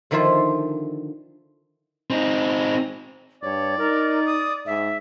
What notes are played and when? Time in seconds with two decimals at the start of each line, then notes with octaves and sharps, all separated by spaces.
0.11 D3 D#3 F3 E4 F4 C5
2.10 C4 D#4
3.43 G2 C#5 D5
3.78 D#4 A#4
4.26 D#6
4.66 G#2 E5